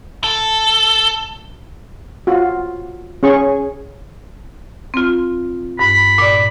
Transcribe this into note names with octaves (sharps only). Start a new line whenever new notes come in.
A4
F4 F#4
C#4 G#4 C#6
C4 F4
G2 B5
A#2 D5